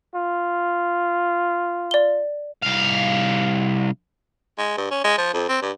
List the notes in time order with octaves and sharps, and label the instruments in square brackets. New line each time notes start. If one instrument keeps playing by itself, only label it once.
[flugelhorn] F4
[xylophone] D5 G7
[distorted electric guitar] C2 F5
[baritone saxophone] G#3
G2
C#4
G#3
F3
F2
C4
G2